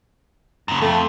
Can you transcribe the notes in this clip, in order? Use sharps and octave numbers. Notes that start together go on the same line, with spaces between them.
F#2 C#3
F2 A3